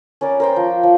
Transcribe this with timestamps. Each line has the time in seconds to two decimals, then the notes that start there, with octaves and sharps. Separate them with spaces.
0.21 C#4 A#4 B4 D5
0.40 A#4 C5 G5
0.56 F3
0.83 F3